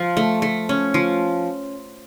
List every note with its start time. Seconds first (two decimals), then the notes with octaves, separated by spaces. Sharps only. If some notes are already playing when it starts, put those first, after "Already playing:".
Already playing: F3 F4
0.17 A3
0.42 A3
0.69 C#4
0.94 F3